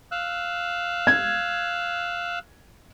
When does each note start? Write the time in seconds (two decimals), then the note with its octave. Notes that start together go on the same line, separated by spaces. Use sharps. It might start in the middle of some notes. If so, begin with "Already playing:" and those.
0.12 F5 E6 F#6
1.07 G#6